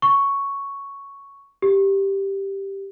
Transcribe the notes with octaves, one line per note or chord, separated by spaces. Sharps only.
C#6
G4